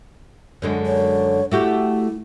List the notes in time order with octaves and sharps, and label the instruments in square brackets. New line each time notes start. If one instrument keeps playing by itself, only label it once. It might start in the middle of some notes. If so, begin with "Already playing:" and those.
[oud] F#2 D3 G#3
[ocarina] C#5
[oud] A3 F#4 G4 [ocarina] E4